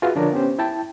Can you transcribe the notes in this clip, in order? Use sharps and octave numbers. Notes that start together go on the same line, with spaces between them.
F4 F#4 G#4 B4 E5 F5
D3 F3 D4 F4 A#4 C#5
B3 C#4 G4 C5
E4 G5 A5